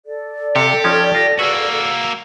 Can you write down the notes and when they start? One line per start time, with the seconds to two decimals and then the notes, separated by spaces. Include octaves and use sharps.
0.06 A4 D5
0.56 C3 G4 F5 A5 C#7
0.84 F3 C#4 D#4 G#6
1.15 F4 A#6
1.39 A#3 F#4 G#4 B4 E6